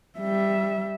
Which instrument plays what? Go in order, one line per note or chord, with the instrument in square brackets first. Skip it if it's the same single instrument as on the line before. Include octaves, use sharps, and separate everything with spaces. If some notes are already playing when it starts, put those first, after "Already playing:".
[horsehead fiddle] G3 E5